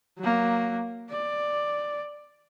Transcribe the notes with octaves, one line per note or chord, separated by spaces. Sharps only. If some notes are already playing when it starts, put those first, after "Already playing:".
F#3 A#3
D5